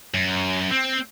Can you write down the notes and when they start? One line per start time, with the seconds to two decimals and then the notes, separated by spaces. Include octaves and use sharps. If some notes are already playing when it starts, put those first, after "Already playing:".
0.14 F#2
0.71 C4